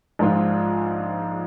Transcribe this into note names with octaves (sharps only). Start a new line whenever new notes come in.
A#1 G#2 F3 G#3 F4